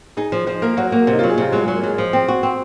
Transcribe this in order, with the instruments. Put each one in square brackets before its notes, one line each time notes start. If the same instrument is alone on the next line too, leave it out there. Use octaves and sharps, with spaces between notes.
[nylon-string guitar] D#4 [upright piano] G#4
[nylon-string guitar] F3
[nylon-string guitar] F3 [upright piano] C5
[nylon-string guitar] A#3 [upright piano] A#4
[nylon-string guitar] F#3 [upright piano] F#4
[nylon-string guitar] A#3 [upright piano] F#4
[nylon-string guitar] C3
[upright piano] D#4
[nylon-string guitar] F#3 [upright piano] F4
[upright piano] G#4
[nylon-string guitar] C3 [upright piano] F4
[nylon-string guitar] F#3 [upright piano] G#3
[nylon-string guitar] F#3 [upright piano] G#3
[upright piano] A#3
[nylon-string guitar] F#3 [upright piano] G#4
[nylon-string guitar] F3
C4
F#4
C4